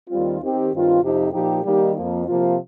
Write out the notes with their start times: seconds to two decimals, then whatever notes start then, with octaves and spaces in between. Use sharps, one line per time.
0.09 D#2 D#3 G3 C4 F4
0.40 D#3 C4 G4
0.72 G2 D#3 C4 F4
1.02 F2 C3 F3 D#4 G4
1.32 A#2 F3 D#4 G4
1.64 D#3 G3 A#3 D#4 G4
1.94 F2 F3 A#3
2.25 C3 F3 A#3 F4